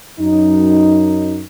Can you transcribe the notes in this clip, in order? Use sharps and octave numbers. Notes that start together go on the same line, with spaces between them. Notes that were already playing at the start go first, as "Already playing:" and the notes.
F#2 D#4